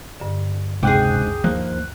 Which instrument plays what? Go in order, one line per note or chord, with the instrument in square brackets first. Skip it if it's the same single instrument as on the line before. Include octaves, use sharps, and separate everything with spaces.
[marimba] G2 D3
[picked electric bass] F#1 G#2 [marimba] D2 [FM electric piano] C3 G5 F#6 [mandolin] G4 G#4
[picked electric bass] D#2 F3 A#3 [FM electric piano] F#6